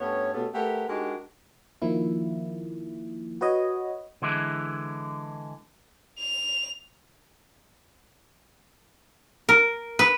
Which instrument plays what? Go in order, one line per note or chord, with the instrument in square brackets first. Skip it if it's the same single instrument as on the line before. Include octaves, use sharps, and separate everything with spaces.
[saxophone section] G2 A3 B3 C#4 C#5
B2 A3 B3 C#4 G4 A4
A3 G4 A#4 B4 F#5
G#3 D4 D#4 F#4 G4 A#4
[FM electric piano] D#3 F3 A#3 E4
F#4 B4 C#5 D#5
[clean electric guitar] D3 E3 G#3 E4
[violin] F7
[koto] A#4
B4